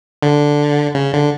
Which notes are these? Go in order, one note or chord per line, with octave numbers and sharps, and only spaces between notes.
D3
C#3
D3